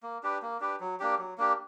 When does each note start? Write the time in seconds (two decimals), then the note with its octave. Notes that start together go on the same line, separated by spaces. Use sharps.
0.03 A#3
0.23 D4 G4 B4
0.42 A#3
0.60 D4 G4 B4
0.80 F#3
1.00 A#3 D4 G4
1.19 F#3
1.38 A#3 D4 G4